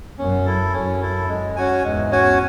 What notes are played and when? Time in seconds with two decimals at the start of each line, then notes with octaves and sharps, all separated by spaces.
0.18 F#2 C#4
0.46 E4 A4
0.73 F#2 C#4
1.01 E4 A4
1.29 G#3
1.56 C#4 F#4 C#5 G#5
1.84 E2 G#2 G#3
2.10 C#4 F#4 C#5 G#5